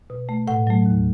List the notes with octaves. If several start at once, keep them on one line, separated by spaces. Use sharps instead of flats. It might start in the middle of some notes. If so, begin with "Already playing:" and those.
B2
A3
A2 F#5
F#3 A3
D#2